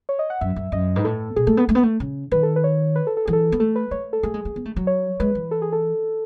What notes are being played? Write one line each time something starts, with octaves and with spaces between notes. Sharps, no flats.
C#5
D#5
F#5
F#2 E5
F#2
F#2 D#5
G#2 B4
A2 A4
B2 G#4
A3 A4
B3
A3
B3
A3
C#3
D#3 B4
A4
B4
C#5
B4
A4
A4
E3 G#4
A4
B3
A3 A4
B4
A3 C#5
A4
A3 G#4
G#3
A3
B3
A3
F#3
C#5
G#3 B4
E3
A4
G#4
A4